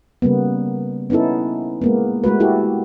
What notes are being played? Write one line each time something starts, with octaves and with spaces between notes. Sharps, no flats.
C#3 G3 A#3 B3
B3 C#4 D#4 E4 A4
G#3 A#3 B3
G#3 A3 F#4 B4
E4 F#4 G4 A4